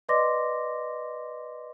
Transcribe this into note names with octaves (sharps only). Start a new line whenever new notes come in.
B4 D5 D#5 C6 D6 A#6